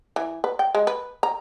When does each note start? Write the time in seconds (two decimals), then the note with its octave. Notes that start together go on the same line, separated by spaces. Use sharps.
0.16 E3
0.44 B4
0.59 G5
0.75 G#3
0.87 B4
1.23 A#5